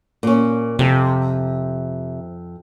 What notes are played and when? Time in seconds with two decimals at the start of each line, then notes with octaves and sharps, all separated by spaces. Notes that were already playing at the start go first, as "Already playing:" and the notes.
0.23 A#2 C#4
0.79 F2 C3